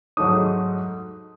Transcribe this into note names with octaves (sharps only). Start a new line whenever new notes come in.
G#2 F#3 A3 D#4 D#6